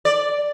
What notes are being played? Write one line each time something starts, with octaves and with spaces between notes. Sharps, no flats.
D5